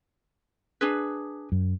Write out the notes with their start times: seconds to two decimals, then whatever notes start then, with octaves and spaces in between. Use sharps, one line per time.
0.81 D4 G#4 B4
1.52 F#2